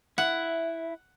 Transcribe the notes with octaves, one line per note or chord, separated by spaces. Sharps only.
E4 E5 F#5